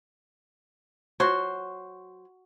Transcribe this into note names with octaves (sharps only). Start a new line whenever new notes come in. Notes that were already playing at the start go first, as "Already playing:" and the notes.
F#3 F#4 C5